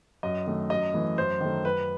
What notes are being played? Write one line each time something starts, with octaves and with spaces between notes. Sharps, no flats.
F#2 D#5
D#3 A3
F#2 D#5
E3 A3
F#2 C5
D#3 A3
F#2 B4